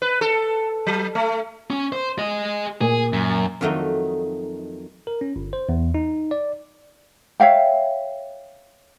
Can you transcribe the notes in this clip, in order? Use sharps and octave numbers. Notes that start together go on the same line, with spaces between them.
B4
A4
F#3
A3
C#4
C5
G#4 D#5
A#2 G#4
F#2
F2 D#3 F#3 A3 D#4
A#4
C#4
G1
C5
E2
D#4
D5
C#5 E5 F5 G5